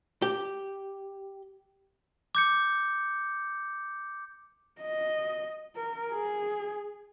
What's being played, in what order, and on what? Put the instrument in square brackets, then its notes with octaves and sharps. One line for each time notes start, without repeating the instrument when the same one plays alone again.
[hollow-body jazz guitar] G4
[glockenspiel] D6 G6 C#7
[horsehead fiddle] D#5
A#4
G#4